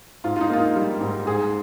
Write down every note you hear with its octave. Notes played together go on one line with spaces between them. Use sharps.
G#2 F4
F4
D#4
A#3 F4
D#4
G3
G#2
G#2 G#4